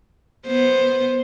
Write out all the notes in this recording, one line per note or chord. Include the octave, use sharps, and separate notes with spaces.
B3 C5